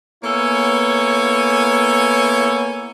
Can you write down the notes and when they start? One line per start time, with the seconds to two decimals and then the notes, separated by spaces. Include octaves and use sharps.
0.23 A#3 B3 E4 A4 C#5 G#5